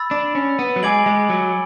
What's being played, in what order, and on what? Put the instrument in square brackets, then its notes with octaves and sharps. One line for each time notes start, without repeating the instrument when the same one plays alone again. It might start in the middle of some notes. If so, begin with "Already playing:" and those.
Already playing: [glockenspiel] B5 E6 A6
[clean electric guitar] D4
C#4
B3
F#3
[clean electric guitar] G#3 [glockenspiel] G#5 D6 G#6 D7 F#7
[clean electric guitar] G#3
F#3